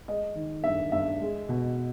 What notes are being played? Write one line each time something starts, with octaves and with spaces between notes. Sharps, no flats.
G#3 D#5
D#3
G2 E5
G2 E5
G#3
B2